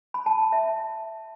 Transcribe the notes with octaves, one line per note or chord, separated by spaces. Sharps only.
B5
A5
E5